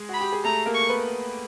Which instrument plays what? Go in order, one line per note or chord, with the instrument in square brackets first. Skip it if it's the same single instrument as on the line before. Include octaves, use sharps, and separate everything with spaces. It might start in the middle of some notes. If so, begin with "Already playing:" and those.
Already playing: [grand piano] G#3 G#4
[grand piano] F#4 [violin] B5
[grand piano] G4
G#4
[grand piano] A3 A4 [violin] A#5
[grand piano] A#3 A#4
[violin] C#6
[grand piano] A#4
B3 B4